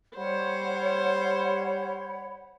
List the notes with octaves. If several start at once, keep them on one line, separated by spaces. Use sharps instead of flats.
G3 C5 C#5 F#5 B5